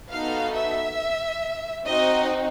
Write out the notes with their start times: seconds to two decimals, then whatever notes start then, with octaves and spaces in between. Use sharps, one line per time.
0.11 B3 D#4 F#4 A4 F5
0.55 E5
1.86 C4 D#4 F#4 D#5